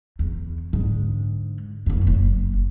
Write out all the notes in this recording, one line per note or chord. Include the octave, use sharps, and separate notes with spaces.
E2
G#2 D3
F#1 F#2
F#1